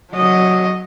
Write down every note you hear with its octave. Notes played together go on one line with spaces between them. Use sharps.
F#3 D#5